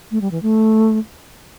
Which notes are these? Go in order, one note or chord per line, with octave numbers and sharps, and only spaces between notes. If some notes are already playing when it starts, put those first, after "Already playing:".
A3
G3
E3
A3